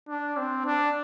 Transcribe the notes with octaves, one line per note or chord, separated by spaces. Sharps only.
D4
C4
D4